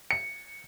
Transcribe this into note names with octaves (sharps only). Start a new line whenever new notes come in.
C#7